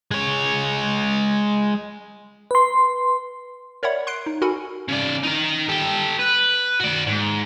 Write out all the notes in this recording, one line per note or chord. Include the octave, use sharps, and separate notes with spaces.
G#3 C#5
B4 C6
A#4 C#5 D5 E5 F#5 B5
C6 F#6 C7 D7
D#4
F#4 A4 A#4 F#5 G#5 B5
C#3 D5
D#4 A#4
G4 A4
B4
F#4 D5
G#2